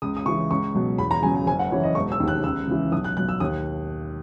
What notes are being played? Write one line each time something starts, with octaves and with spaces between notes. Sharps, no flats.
C#2 D#6
D#6
C#3 E3 C#6
C#2 C#6
B2 F#3
E2 B5
A#5
C#3 F#3 G#5
G#5
F#1 G#5
F#5
F#2 E3 C#5
D#5
E1 C#6
E6
D#2 D#3
F#6
C#2 E6
C#3 E3
B1 D#6
F#6
B2 F#3 F#6
E6
D#2 D#6